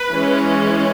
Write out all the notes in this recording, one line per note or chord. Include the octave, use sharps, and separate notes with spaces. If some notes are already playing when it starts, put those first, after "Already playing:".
Already playing: B4
E3 G#3 C#4